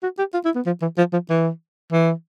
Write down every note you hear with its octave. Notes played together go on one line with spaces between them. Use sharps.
F#4
G4
F4
E4
B3
F3
E3
F3
F3
E3
E3